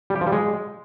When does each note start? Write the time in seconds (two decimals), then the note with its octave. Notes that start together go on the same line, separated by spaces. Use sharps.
0.10 G3
0.16 G4
0.21 F3
0.27 G3
0.32 G#3